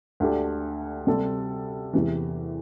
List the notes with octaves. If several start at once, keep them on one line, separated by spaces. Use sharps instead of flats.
D2 D3 A3 D4 G4
C3 G3 C4 A4
E2 C3 E3